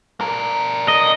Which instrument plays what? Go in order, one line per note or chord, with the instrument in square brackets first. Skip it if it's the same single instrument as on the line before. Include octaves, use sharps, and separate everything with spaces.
[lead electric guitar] D4 A#4
[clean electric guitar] D#5